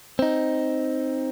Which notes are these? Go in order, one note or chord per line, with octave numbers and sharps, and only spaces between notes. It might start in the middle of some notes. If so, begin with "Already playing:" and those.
C4 D#4